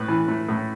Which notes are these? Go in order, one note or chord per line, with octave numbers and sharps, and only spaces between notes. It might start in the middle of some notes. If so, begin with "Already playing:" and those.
Already playing: A2 B4
E3
A3
A2